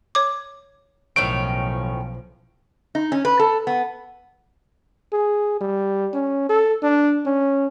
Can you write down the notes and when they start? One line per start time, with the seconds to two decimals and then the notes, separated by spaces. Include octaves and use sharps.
0.15 C#5 D6
1.16 B1 A2 D#3 F3 C#4 D7
2.95 D#4
3.12 C#4
3.25 B4
3.39 A4
3.67 B3
5.13 G#4
5.61 G3
6.13 C#4
6.49 A4
6.82 D4
7.26 C#4